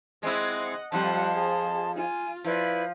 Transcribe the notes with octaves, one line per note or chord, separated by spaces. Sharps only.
G#3 C4 E4 D#5 F#5
F2 F3 G3 F#5 A5 C6
G#4
F4 G#5
F3 E4 B4 D5